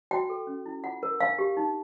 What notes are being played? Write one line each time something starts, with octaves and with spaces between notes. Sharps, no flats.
F#4 G5
A4
C#4
E4
F4 F#5
A#4
D4 F5
G4
D#4